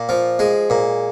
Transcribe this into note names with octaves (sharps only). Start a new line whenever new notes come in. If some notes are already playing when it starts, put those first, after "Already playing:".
Already playing: A#2
F3
G#3
A#2